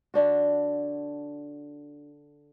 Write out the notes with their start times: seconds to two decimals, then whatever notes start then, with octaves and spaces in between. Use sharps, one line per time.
0.14 D3 D4 F#4